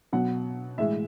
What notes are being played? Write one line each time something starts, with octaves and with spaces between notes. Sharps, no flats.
B2 F#3 F#5
A2 E3 G#3 E5